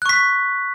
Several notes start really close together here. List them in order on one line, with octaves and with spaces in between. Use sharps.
F#6 C#6 B6